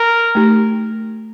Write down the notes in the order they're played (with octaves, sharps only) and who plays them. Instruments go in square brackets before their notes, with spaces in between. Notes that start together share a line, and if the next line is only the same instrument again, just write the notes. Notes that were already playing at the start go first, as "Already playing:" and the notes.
Already playing: [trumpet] A#4
[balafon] A3 D#4 G4